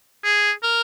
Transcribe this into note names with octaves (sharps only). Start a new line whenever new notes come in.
G#4
A#4